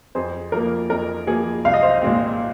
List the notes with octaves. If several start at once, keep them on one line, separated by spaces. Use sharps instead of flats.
F2 G#4 C5
F3 A#3 A#4
F2 A#4
F3 A#3 G#4
C2 F5
D#5
C5 F5
A#2 G#3 C4